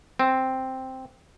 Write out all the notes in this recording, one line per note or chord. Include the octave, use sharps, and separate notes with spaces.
C4